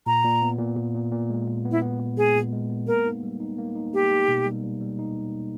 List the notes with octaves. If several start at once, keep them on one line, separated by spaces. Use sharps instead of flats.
A#2 A#5
A#2
B3
A#2
A#2
A#2
A#2
G#3
A#2
B3
E4
B3
B3
G#3 G#4
A#2
G#3
B3
A#3 A#4
D#4
G3
D#4
A#3
D#4
A#3 G4
D#4
B2
G3
G3
G3
D#4